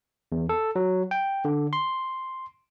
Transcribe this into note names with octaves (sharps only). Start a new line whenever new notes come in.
E2
A4
F#3
G5
D3
C6